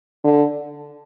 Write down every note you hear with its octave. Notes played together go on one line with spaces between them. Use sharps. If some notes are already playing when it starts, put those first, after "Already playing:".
D3